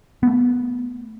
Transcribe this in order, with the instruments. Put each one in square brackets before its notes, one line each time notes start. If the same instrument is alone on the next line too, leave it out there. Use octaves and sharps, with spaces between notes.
[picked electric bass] A3 B3